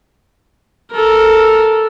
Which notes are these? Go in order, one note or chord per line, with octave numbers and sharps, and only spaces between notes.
A4 A#4